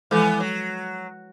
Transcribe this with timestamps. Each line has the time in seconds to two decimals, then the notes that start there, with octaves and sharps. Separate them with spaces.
0.11 E3 F3 G#3 B3 A4
0.40 F#3